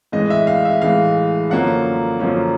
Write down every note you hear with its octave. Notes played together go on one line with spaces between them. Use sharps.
A2 E3 G#3 D#5
E5
F5
E5
A2 E3 G#3 F5
F#2 D3 F3 A#3 C#4 F#5
F#2 D3 F3 A#3 C#4